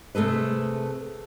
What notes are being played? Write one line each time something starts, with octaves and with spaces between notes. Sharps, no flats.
C3 A3 G#4 A4 B4